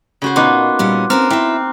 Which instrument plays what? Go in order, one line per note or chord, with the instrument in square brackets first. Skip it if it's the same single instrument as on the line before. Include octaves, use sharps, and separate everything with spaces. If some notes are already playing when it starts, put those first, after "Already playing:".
[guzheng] C#3 F#4 C5
[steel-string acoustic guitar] A#2 [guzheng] A#3 B3 D#4 [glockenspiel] C6 D6 F#6
[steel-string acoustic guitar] A#2 G3 C#4
[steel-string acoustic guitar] C4 C#4 A#4 [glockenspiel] A#5 F6
[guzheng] C4 [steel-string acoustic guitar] E4 E5